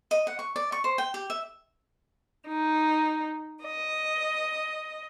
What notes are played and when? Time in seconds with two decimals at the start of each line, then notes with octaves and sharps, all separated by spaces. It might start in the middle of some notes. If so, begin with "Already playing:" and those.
0.11 D#5
0.27 F#5
0.39 C#6
0.56 D5
0.72 C#6
0.84 C5
0.98 G5
1.14 G4
1.30 E5
2.48 D#4
3.64 D#5